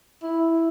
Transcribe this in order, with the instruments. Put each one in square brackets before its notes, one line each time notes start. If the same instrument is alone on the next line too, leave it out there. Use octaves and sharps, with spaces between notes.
[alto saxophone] E4